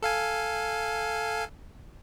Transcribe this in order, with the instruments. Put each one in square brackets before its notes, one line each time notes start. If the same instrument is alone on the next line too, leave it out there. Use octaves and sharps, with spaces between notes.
[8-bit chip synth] A4 F5 G#5